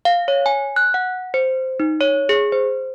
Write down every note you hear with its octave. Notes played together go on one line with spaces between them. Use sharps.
F5
C#5
G#5
F#6
F#5
C5
D#4
C#5
G#4
C5